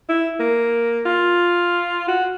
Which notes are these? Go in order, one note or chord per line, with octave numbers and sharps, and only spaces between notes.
E4
A#3
F4
F#4